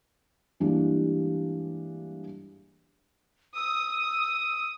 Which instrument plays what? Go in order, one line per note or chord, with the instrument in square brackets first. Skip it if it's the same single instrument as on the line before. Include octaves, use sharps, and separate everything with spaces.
[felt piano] G2 E3 G3 G#3 A#3 D4
[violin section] D#6 [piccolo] E6